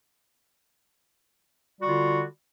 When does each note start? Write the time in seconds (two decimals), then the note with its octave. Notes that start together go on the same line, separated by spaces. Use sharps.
1.79 G3
1.82 F#4
1.85 D3
1.89 F4